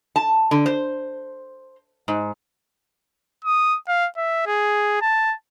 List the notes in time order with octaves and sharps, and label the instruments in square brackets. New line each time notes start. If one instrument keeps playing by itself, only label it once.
[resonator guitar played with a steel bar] A5
D3
C5
G#2
[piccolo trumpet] D#6
F5
E5
G#4
A5